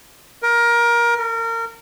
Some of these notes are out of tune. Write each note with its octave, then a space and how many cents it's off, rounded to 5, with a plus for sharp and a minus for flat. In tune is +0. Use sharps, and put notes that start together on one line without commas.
A#4 +20
A#4 -30